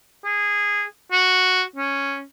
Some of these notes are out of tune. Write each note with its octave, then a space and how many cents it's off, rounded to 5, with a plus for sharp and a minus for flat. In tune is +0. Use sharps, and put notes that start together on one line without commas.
G#4 -15
F#4 -5
C#4 -5